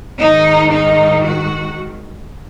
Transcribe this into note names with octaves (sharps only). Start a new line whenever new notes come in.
G#2 D#3 D#4
D#4
F#4